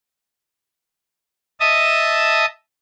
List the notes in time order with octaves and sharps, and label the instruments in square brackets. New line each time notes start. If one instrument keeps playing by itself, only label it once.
[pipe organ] D#5 E5 A5 D#6